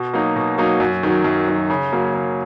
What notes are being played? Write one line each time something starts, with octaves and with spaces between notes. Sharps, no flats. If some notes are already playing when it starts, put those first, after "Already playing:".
Already playing: B2
F#3 A#3 D#4
B2
F#3 A#3 D#4
F#2
D#3 F#3
F#2
D#3 F#3
C#3
F#3 A#3
C#3